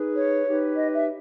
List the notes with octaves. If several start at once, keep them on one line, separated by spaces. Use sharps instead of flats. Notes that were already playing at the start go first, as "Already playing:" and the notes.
Already playing: D#4 G#4 B4
C#5
D#4 G4 B4
D#5
E5